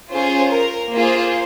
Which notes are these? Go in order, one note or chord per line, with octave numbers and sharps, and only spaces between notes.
C#4 F4 G#4 C5
A#4
A#3 F4 G#4 C5